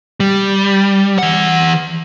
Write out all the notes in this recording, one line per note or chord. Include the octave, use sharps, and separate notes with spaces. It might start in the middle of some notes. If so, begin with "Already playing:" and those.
G3
E3 F#5